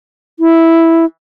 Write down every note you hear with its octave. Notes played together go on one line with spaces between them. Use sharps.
E4